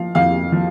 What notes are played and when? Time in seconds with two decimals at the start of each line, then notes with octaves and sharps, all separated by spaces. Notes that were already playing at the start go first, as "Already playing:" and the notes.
Already playing: F3 F5
0.15 F2 F5
0.52 F3